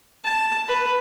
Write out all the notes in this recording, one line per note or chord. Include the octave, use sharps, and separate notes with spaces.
A5
B4